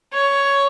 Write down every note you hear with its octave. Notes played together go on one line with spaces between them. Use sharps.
C#5